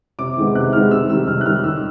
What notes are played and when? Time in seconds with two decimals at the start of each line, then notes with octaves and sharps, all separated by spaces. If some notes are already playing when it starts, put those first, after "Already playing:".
0.19 C3 D6
0.37 D#3 G#3 B3
0.55 C3 F#6
0.73 D#3 G#3 B3 F6
0.91 C3 E6
1.09 D#3 G3 E6
1.27 C3 F6
1.41 F#6
1.46 D#3 G3 F6
1.64 D#3 E6